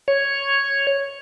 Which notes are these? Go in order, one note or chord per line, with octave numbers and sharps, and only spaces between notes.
C#5